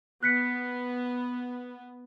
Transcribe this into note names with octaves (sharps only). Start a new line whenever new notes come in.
B3 F#6 B6 C#7